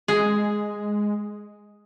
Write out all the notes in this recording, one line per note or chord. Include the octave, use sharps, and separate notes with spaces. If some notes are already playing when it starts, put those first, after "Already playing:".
G#3 G#4